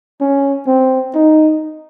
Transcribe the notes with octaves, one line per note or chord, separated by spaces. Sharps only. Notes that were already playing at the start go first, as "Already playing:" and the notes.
C#4
C4
D#4